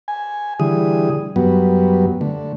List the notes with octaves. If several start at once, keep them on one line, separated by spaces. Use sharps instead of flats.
G#5
D3 E3 G3 G#4 D#6
F#2 F#3 G3 B3
D3 A3